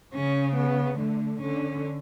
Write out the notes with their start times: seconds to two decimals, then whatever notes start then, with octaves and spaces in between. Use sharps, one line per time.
0.14 C#3 C#4
0.56 B3
0.99 D3 A3
1.41 D3 C#4